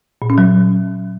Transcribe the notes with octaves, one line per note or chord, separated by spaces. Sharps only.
A#2
C#4
F#3